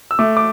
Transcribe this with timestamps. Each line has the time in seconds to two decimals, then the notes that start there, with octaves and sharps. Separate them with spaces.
0.11 E6
0.19 A3 D6
0.37 D6